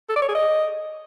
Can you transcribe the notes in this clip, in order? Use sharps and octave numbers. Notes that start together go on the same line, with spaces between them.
A4
D5
C#5
G#4
D#5